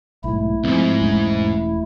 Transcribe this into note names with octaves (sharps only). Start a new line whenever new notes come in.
B1 G#2 A3 E4
B1 G#2 F3 C4
E1 G#3 C#4